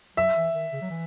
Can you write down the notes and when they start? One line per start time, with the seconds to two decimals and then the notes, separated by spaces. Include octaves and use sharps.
0.17 F#3 E5
0.36 E3
0.54 D#3
0.72 C#3
0.82 F#3
0.90 E3